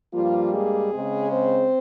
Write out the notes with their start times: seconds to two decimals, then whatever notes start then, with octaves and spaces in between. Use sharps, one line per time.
0.13 G2 F3 G3 A#3 F4
0.52 G#3 G#4
0.91 C#3 G#3 C4
1.30 C4 C5